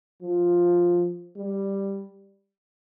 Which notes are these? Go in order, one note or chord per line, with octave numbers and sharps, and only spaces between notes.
F3
G3